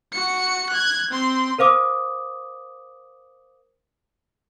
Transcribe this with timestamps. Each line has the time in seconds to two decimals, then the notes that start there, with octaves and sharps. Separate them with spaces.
0.13 F#4 C#7
0.69 F#6 G#6
1.10 C4 C6
1.58 A#4 C5 F5 D6 D#6